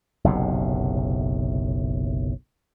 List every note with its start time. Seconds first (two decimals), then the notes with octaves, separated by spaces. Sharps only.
0.24 F#1 B1 A2 C3